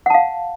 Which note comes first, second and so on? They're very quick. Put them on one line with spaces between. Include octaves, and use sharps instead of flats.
F#5 A5 F5